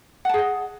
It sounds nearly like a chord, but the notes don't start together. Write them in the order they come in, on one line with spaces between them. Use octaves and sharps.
F#5 A5 G#4 D#5